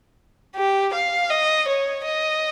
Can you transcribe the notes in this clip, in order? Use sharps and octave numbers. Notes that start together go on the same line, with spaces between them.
G4
F5
D#5
C#5
D#5